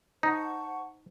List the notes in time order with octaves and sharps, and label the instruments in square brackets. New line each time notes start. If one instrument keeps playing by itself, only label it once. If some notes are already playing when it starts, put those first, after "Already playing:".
[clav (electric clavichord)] D#4 [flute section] C5 F#5 A5 C#6